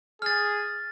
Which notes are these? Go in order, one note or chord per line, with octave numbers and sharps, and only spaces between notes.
G#4 F6 A6